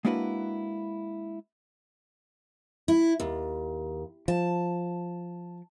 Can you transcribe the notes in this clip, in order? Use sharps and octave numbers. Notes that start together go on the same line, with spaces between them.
G#3 A#3 D4 E4 F#4 B4
E4
D#2
F3 A5